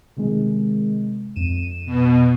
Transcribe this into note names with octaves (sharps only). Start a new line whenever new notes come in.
C3 D#3 G#3
F2 D#7 E7
B2